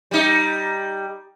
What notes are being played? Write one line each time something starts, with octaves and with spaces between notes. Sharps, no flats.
G3 D#4